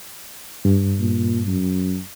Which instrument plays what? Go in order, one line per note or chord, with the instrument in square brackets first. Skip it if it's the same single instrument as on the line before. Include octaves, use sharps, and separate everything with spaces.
[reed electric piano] G2
[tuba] A#2
F#2